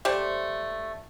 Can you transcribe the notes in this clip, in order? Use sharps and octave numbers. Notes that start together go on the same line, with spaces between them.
A3 G4 C5 D5